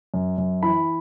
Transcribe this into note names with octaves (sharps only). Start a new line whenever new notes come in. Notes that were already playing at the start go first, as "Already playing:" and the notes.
F#2
F#2
E3 B5